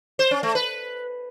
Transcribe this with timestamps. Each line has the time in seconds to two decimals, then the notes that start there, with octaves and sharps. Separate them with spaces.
0.19 C5
0.31 C#4
0.43 A3
0.55 B4